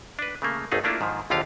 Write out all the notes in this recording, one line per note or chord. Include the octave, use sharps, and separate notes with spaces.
D4 B4
C#3 A3 A#3
G#1 D#2 A3 D#4 G#4
A3 A#3 D4 E4 F4
G#2 D#3 F3
A#1 D#2 D3 F4 G4 F5